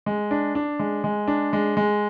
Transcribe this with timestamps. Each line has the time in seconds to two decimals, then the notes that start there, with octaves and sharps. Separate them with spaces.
0.06 G#3
0.31 D4
0.55 D4
0.79 G#3
1.04 G#3
1.28 D4
1.53 G#3
1.77 G#3